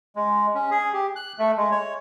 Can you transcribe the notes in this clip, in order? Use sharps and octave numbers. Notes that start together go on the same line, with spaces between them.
G#3
C#4
G#4
G4
F#6
A3
G#3
C#5